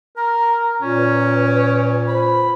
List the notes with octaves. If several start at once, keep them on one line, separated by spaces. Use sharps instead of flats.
A#4 A#5
A#2 C#4
B4
C5 B5